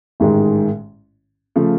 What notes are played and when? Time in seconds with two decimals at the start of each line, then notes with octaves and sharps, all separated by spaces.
0.20 A1 G#2 D#3 G#3
1.56 C#3 F3 A3